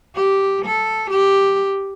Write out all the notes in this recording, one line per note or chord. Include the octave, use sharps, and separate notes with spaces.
G4
A4
G4